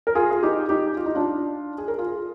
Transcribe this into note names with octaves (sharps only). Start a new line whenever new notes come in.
A#4
F4 G#4
F4
D#4 G4
D#4 G4
F4
D#4
D4 F4
G#4
A#4
F4 G#4